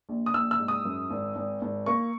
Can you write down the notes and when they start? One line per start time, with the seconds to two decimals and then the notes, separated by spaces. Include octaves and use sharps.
0.09 A#1
0.26 D#6
0.34 A#1 E6
0.51 E6
0.60 G#2
0.68 D#6
0.85 F#2
1.10 G#1
1.36 G#1
1.62 G#1
1.86 A#3 C#6